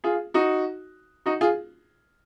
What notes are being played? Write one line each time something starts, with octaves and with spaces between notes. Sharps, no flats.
F4 G#4
D#4 F#4
D#4 F#4
F4 G#4